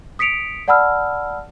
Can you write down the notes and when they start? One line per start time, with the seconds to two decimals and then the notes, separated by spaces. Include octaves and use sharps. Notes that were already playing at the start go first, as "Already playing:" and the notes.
0.19 D#6 B6 C#7 D7 F7
0.68 D5 F#5 A5 B5 E6 F6